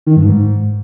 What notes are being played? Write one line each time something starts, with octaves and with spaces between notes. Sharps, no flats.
D#3
G2
G#2